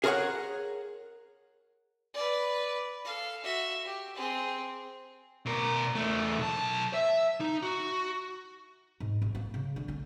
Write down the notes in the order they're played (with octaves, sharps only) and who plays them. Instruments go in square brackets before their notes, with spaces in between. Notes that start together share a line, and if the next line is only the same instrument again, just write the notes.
[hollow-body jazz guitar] G#4 A#4 C5 C#5 F#5
[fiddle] B4 D5
A4 F5
F#4 E5
G4
C4 G#4
[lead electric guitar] B2 A#4
E2 A3
B1 A5
E5
D#4
F#4
[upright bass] G#2
A1
A#3
C#3
D3
A3